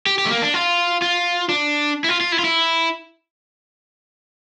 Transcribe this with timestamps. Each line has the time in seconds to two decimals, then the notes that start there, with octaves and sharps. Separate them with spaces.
0.06 G4
0.18 G4
0.25 A3
0.31 A#3
0.42 D4
0.54 F4
1.02 F4
1.49 D4
2.04 E4
2.09 F4
2.21 F4
2.32 E4
2.39 F4
2.44 E4